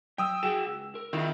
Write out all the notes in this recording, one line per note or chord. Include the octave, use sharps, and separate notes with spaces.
F#3 G5 D#6 E6
F#4 G#4 G5 E7
C#2
A#4
D#3 C4 E4 F4